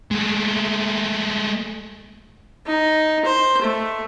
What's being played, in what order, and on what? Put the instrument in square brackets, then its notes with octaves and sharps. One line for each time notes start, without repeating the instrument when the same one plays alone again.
[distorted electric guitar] G#3 A3
[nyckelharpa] D#4
C5
A3